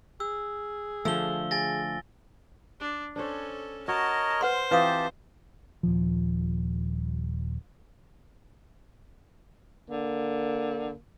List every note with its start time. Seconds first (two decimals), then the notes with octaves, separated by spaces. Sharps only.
0.20 G#4 E6
1.05 D3 F3 A3 E6 G7
1.51 G#4 G#5 A6 A#6
2.80 D4
3.16 C#4 D4 A4 C5 C#5
3.88 F#4 A#4 C#5 D#5 A5
4.41 B4 C5 F#5 C6
4.71 E3 C4 F4 G4 B4 F5 A5 D#6
5.83 D#1 F3
9.90 D3 A#3